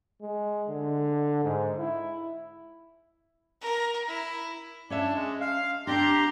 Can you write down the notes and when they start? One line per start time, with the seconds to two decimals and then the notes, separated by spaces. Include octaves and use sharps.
0.22 G#3
0.68 D3
1.44 G#2
1.78 E4
3.61 A#4
4.08 E4
4.90 C#4 D4 C#5 E5
5.14 G#3
5.41 F5
5.87 C4 D4 G4 A#5 C6